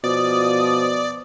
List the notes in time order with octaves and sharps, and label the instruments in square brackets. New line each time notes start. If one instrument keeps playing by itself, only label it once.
[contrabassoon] B2 [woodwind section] F3 D#6 [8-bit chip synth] D5